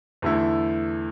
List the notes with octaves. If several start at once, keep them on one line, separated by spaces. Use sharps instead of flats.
E2 D3 A3 E4